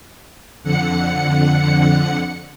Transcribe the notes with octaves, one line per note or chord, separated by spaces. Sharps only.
F2 D3 F#5 C#7